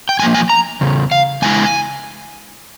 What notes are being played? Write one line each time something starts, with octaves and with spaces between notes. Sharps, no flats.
G5
E2 C3 F3 A#3 G#5
G#5
A#5
E2 C#3
F5
E2 C#3 G#3 E4 G#5